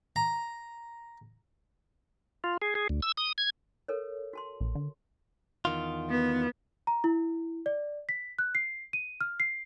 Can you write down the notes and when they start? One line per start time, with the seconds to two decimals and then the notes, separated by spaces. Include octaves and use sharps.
0.16 A#5
2.44 F4
2.62 G#4
2.75 G#4
2.89 D2
3.02 E6
3.17 D#6
3.38 G#6
3.88 A4 A#4 C#5
4.33 F#4 A5 C6
4.60 A#1
4.75 D3
5.65 E2 D#3 F4
6.10 B3
6.87 A#5
7.04 E4
7.66 D5
8.09 B6
8.39 F#6
8.55 C7
8.93 D#7
9.21 F6
9.40 C7